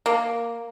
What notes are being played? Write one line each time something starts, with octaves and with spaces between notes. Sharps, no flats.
A#3